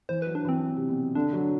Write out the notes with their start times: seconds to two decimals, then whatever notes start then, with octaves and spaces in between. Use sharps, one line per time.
0.09 E3 C5
0.22 F#3 B4
0.35 D4
0.45 E3 C4
0.76 C3
0.88 B2
1.15 D3 D4
1.33 F#3